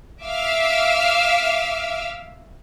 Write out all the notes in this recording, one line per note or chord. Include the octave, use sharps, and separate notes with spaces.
E5 F5 D6 E6 F6